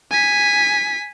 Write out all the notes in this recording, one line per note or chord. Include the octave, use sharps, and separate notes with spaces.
G#5 B6